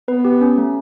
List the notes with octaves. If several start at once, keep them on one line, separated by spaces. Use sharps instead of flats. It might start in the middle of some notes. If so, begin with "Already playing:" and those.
B3 B4
G4
C#4
A3